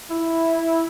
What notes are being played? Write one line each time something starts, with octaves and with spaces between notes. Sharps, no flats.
E4